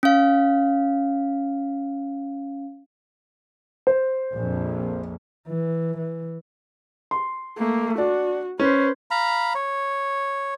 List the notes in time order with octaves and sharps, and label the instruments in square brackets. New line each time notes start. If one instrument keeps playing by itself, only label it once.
[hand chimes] C#4 F5
[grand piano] C5
[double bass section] A#1 F2
[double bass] E3
E3
[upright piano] C6
[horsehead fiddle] A3 A#3
[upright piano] D4 [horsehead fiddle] F#4
[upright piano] C#4 [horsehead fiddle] B4 C5
[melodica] F5 A#5 B5
C#5